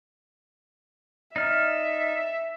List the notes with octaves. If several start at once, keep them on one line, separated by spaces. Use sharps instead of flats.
D#4 D5 E5 F6